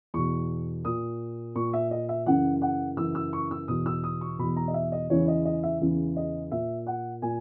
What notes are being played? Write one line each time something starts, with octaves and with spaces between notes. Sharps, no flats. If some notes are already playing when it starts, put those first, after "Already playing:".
E2 B2 C#6
A#2 D#6
A#2 C#6
E5
D#5
E5
F#2 C#3 E3 F#5
F#5
F#2 C#3 E3 E6
E6
C#6
E6
E2 B2 D#6
E6
D#6
C#6
E2 B2 B5
A#5
D#5
E5
D#5
E2 C#3 E3 C#5
D#5
D#5
E5
E2 C#3 E3
D#5
A#2 E5
F#5
A#2 G#5